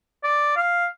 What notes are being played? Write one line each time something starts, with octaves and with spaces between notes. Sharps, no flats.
D5
F5